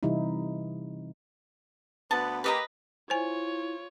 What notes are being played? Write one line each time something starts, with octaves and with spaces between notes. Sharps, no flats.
C3 E3 G3 D#4 E4
D2 B3 A5
A#3 G4 B4 D#5 A#5
E4 F4 C5 C#5 G#5